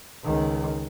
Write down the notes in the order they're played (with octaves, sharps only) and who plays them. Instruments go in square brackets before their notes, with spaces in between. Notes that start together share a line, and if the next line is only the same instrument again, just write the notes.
[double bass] C#2 D#3